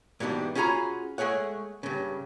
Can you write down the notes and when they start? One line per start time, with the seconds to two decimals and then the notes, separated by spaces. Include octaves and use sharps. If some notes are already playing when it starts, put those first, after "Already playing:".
0.20 G#2 B2 E3 G3 D4
0.55 C#4 F4 F#4 G#4 A#5 B5
1.18 G#3 A3 G#4 C#5 F#5
1.83 G2 C#3